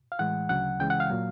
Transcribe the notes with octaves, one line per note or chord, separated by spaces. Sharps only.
F5
A2 E3 G#3 F#5
D2 C#3 F#3 F#5
C#2 C#3 E3 G#3 G5
F#5
F5
A#2 F#3